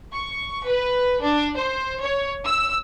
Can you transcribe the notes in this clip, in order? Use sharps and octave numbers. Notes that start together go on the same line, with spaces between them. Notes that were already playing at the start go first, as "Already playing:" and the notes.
C#6
B4
D4
C5
C#5
E6